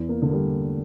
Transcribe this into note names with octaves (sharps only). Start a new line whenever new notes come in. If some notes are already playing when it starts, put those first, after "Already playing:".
Already playing: E2
A#3
D3
A#3
G3